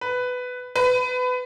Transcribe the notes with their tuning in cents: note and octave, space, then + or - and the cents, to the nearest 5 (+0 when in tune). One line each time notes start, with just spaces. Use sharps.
B4 +10
B4 +25